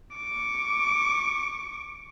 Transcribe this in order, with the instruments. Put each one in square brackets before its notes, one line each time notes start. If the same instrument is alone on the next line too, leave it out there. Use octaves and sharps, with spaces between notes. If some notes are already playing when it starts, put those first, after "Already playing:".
[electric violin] C#6 D6